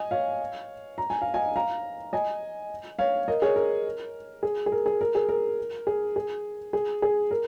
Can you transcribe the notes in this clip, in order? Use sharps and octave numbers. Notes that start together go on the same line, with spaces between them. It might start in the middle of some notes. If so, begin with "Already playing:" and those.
Already playing: D#5 G#5
C#5 F5
A#5
G#5
F5
D#5 G#5
F5 A#5
D#5 G#5
C#5 F5
A#4 D#5
G#4 C#5
A#4
G#4
G#4
A#4
G#4
A#4
G#4
A#4
G#4
G#4
G#4
G#4
A#4